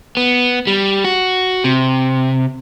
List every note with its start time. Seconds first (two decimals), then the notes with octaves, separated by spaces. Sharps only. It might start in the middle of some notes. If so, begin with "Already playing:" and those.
0.17 B3
0.67 G3
1.04 F#4
1.64 C3